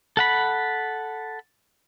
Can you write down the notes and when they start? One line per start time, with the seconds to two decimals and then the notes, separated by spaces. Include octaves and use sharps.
0.17 A4 F#5 B5